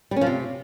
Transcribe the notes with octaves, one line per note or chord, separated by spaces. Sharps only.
G3
C#4
F3
C3